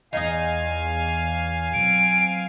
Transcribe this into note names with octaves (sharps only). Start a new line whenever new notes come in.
E2 D#4 D#5 F5 G#5
B2 F#3 C4 D7